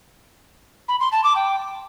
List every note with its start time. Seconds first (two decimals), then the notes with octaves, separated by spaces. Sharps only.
0.88 B5
1.00 C6
1.12 A5
1.23 D6
1.35 G5